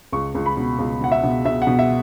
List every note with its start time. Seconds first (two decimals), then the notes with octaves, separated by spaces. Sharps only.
0.12 C#2 C#6
0.35 C#2
0.46 B5
0.57 B2
0.79 C#2
1.01 B2 F#5
1.12 E5
1.23 B2
1.45 B2 E5
1.62 F#5
1.67 B2
1.79 E5